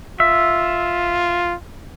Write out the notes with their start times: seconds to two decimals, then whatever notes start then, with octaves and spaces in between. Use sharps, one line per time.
0.20 F4 E5